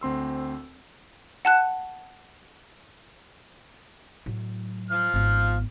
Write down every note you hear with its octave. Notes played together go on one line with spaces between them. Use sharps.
D2 C4 C6 E6
F#5 A5 F#6
A2 F#3
F3 F6
G#1 B3